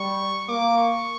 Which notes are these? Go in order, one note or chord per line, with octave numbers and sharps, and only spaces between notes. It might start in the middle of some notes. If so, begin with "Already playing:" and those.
Already playing: G3 C#6
A#3 D6
C#6